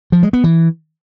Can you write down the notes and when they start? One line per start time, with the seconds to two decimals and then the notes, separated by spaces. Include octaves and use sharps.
0.12 F3
0.23 G#3
0.33 B3
0.44 E3